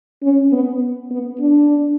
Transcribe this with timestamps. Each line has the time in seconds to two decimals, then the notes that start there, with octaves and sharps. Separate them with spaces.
0.23 C#4
0.52 B3
1.11 B3
1.40 D4